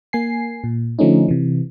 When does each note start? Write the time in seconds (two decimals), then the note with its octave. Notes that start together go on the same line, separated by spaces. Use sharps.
0.13 A#3 G#5 C7
0.64 A#2
0.99 D3 F3 A3 C#4 D#4
1.28 C3 E3